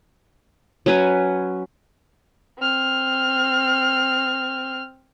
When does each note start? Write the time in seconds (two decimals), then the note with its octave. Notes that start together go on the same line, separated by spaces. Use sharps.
0.86 F#3 C#4 B4 G#5
2.59 C4 F6